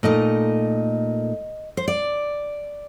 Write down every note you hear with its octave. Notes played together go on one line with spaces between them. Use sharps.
A#2 A3 D#4 D#5
C5
D5